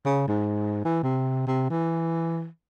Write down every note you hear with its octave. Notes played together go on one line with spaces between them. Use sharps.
C#3
G#2
E3
C3
C3
E3